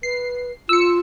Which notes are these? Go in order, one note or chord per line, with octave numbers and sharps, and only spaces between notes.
B4 C7
F4 E6 C#7